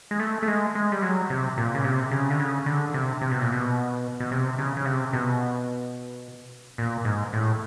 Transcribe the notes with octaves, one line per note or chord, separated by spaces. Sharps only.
G#3
A3
A3
G#3
G#3
G3
F#3
C3
A#2
C#3
C3
C#3
D3
C#3
D3
C3
C3
B2
A#2
B2
B2
C3
C#3
C#3
C3
B2
A#2
G#2
A2